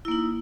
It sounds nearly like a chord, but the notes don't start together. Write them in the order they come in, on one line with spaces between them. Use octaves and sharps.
E4 A#3 D#4